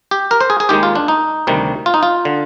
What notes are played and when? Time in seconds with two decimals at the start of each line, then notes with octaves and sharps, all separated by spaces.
0.11 G4
0.31 A#4
0.41 C5
0.50 G#4
0.60 G#4
0.69 D#2 D#3 G#3 G4
0.83 F4
0.95 D4
1.08 D#4
1.47 D2 C3 D#3 G3
1.86 F4
1.94 D#4
2.03 F4
2.25 D3